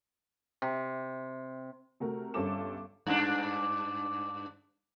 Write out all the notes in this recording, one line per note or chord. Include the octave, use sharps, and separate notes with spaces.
C3
C3 A3 F#4 A#4
G1 G2 C#4 A4 D6 E7
G2 D4